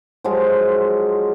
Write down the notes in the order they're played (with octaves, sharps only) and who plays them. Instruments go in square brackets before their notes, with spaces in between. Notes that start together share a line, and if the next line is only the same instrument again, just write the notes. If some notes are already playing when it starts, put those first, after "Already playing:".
[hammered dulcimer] F3 F#3 G#3 F4